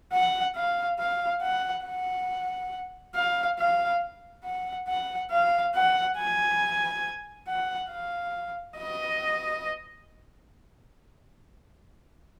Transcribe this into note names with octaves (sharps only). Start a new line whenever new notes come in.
F#5
F5
F5
F#5
F#5
F5
F5
F#5
F#5
F5
F#5
G#5
F#5
F5
D#5